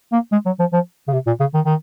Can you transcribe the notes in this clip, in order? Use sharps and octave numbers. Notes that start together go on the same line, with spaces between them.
A#3
G#3
F#3
F3
F3
C#3
C3
A#2
C#3
D#3
D#3